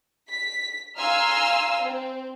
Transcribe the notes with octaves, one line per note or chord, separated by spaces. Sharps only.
B6
F5 G#5 A#5 C6 E6 F6
C4